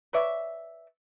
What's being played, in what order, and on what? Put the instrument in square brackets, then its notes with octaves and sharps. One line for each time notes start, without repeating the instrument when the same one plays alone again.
[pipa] B4 C#5 D5 E5